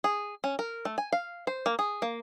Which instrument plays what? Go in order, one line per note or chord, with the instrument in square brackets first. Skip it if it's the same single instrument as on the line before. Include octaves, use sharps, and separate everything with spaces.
[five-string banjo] G#4
C#4
A#4
A3
G#5
F5
C5
A#3
G#4
A#3